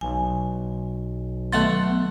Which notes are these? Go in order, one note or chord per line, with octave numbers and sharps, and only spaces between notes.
B1 G#5
D#3 F#3 A3 B3 F#5 C6